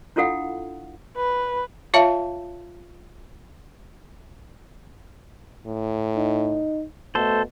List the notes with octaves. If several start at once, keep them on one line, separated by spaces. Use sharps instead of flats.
D4 E4 F4 A4 F5 F#5
B4
F4 C#5 E5 F5 A5
A2
D#4
B2 A3 A4 C5